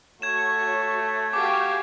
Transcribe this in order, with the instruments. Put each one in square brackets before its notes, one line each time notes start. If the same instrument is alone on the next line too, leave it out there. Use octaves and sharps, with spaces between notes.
[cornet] A3 [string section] F#4 C#5 C#6 [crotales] G#6 E7
[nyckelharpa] F#4 G4 [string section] F5 G5 G#5 [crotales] D6